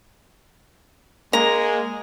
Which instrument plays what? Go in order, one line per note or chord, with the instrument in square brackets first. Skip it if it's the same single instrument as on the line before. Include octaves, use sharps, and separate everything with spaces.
[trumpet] G#3 [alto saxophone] A#3 [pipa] A#5